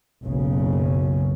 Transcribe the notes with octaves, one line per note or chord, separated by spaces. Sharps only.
F#1 B1 C#3